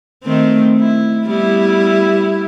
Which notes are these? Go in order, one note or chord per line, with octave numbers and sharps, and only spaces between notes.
D#3 A3 C4
E4
G3 B3 E4